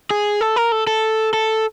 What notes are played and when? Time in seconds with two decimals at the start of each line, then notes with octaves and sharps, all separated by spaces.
0.11 G#4
0.41 A4
0.56 A#4
0.72 A4
0.87 A4
1.33 A4